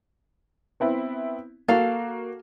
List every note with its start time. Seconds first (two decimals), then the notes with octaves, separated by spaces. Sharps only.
0.80 B3 C4 E4
1.68 A#3 F#4 A4 F5